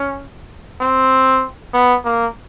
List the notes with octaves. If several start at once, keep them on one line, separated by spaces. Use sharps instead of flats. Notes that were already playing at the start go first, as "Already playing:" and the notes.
Already playing: C#4
C4
B3
A#3